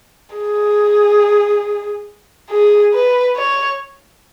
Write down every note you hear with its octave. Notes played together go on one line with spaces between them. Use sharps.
G#4
G#4
B4
C#5